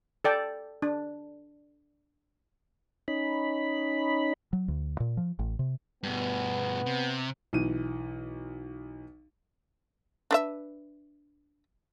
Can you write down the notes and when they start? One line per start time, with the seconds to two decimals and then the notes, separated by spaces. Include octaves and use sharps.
0.25 A4 D5 G5
0.82 D4
3.08 C#4 D#4 B5
4.53 F#3
4.68 D2
5.00 A#2
5.17 F3
5.39 A1
5.59 C3
6.03 G2 B2 B3
6.86 C3
7.53 B1 E3 D#7
10.31 D4 B4 E5